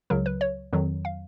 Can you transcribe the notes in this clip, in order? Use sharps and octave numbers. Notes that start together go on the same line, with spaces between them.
C#2 C#3 F#3 A#4
B4
C#5
F2 D#3 F#3
F5